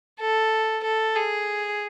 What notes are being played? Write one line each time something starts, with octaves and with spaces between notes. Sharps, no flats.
A4
A4
G#4